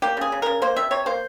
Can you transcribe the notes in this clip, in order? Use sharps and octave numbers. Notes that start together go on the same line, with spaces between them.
A#3 G4
C#3 G#4
C#3
C#3 A#4
A#3 C5
C3 E5
C3 C#5
A#3 C5